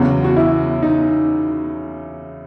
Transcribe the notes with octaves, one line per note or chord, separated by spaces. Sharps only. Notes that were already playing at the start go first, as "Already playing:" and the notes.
Already playing: E2 C#3 F#3 F#4
F#4
E4
D#4